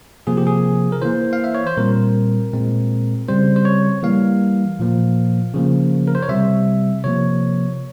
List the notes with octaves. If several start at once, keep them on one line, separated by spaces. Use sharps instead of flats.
C3 F3 A#3 G#4
G4
G#4
A#4
E3 A#3 C5
F5
E5
C#5
C5
A#2 G3 C4 A#4
A#2 G#3 C4
C#3 G3 C4 C5
C5
C#5
E3 G3 A#3 F5
A#2 F3 A#3
C#3 F3 A#3
A#4
C5
C#5
C3 G3 C4 E5
C3 F3 A#3 C#5